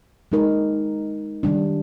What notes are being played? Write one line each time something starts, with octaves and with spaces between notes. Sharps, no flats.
G#3 D#4 A#4
D#3 G3 D4